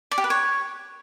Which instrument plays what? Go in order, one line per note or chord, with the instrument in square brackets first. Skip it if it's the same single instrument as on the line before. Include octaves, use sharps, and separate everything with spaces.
[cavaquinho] D5
G4
B4
C#5